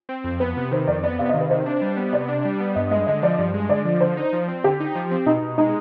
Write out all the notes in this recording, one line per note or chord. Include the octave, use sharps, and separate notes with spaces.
C4
F2
B3 B4
C3
D#3 C5
F2 D5
B3 D5
C3 F5
D#5
D#3
B4
C3 C5
D4
G3
B3
C3 D5
D4
G3
B3
G2 D#5
G#3 D#5
D3 D#5
F3 D5
G2
G#3
D3 D5
F3
D3 C5
D#4
F3
C4
D3 G4
D#4
F3
C4
B2 D#4
B2
G#3 D#4